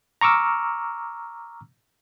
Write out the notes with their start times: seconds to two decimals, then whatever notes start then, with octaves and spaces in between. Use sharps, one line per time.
0.21 A#5 C#6 D6 E6 F6